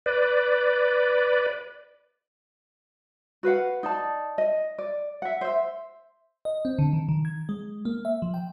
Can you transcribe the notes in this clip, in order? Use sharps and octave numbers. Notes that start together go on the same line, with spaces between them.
B4 D5
F#4 B4 F5 F#5
D#4 D5 A5
D#5
D5
E5 F#5
C5 E5
D#5
C4
D3
D#3
D#3
G#6
G#3
A#3
E5
F3
G5